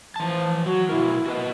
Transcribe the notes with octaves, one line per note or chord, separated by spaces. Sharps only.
E3 F3 A5
F#3 F#4
B2 D#3 E4 A#4
F#4 B4 D#5